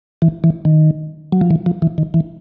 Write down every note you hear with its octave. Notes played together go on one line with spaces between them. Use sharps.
E3
E3
D#3
F#3
F3
E3
F3
E3
D#3
E3